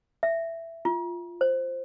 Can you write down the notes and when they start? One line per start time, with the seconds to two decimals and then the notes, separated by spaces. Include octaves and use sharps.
0.23 E5
0.85 F4
1.41 C5